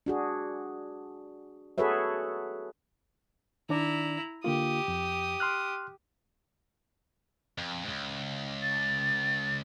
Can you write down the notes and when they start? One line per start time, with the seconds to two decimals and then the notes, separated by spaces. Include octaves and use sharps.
0.06 D4 F#4 G#4
1.78 F#4 G#4 A4 B4 C#5 E5
3.69 D#3 D4 E4 D5 A#5
4.44 D3 A#3 F4 G4 D#6
4.88 F2
5.40 C6 F6 F#6
7.58 F2
7.85 C#2 G#2
8.62 A6